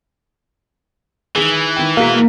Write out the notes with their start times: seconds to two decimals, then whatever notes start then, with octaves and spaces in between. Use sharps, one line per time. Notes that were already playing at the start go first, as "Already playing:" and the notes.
1.35 D#3 E3 G#4
1.76 D#3 G5
1.97 B2 G#3 A#3 B6